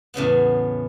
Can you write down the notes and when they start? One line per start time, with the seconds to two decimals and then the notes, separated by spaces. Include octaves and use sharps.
0.14 E2 A2 C#3 B3